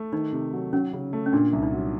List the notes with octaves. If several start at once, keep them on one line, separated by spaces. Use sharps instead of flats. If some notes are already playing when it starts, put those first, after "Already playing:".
Already playing: A3
D#3 D#4
C3
F#3
F#3 C#4
C#3
A3
C#4
A#2 D4
C2
D#4
F#3